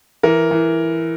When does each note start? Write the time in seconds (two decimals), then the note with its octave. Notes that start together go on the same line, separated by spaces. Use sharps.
0.23 E3 A#4
0.51 E3